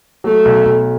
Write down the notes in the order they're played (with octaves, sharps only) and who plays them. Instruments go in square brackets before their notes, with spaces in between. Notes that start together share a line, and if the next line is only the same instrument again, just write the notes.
[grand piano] F#3 [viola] A3
[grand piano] B1
B1